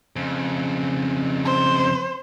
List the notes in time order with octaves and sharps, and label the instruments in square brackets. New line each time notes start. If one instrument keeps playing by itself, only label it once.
[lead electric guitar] F2 C#3
[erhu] C5